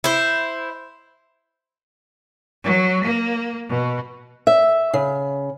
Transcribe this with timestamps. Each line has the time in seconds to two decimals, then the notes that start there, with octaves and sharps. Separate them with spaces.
0.04 E4 C5
2.64 F#3
3.04 A#3
3.70 B2
4.47 E5
4.93 C#3